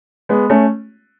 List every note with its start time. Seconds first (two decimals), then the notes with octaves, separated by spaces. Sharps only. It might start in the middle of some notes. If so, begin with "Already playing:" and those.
0.29 G#3 B3
0.50 A3 C#4